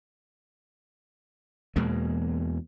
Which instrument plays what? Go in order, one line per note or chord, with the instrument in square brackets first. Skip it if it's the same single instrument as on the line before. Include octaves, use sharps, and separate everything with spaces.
[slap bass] E2 B2 G#3 A#3